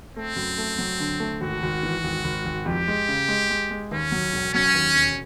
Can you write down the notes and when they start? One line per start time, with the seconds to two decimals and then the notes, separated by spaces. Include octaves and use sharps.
0.16 A3 C4
0.36 F#2
0.58 A3
0.78 F#3
1.00 D3
1.20 A3
1.41 G#1 F#4
1.63 G#1
1.83 E3
2.04 G#1
2.24 G#1
2.46 G#1
2.66 F2 G4
2.88 G#3
3.08 C#3
3.28 G#3
3.50 G#3
3.71 G#3
3.91 D#2 C#4
4.12 F#3
4.34 E1
4.54 F#3 C#4
4.74 D#2
4.96 E1